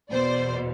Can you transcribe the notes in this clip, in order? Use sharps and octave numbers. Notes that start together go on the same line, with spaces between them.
E2 B2 C5 D5